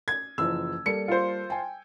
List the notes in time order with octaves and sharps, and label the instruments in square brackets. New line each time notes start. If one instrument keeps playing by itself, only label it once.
[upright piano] G#6
[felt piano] F#1 E3 F3 [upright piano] E6
[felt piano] G3 A#3 A4 [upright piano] C#7
[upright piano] F4 C5
[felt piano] G5 G#5